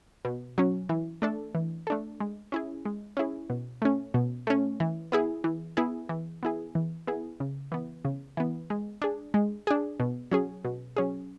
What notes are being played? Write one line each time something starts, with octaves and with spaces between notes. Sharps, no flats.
B2
F#3 C#4
E3
A3 D4 A4
E3
A3 D4 A4
G#3
C#4 E4 G#4
G#3
C#4 E4 G#4
B2
A3 C#4
B2
A3 C#4
E3
B3 E4 G#4
E3
B3 E4 G#4
E3
B3 E4 G#4
E3
B3 E4 G#4
C#3
E3 B3
C#3
E3 B3
G#3
D4 G#4
G#3
D4 G#4
B2
F#3 C#4 G#4
B2
F#3 C#4 G#4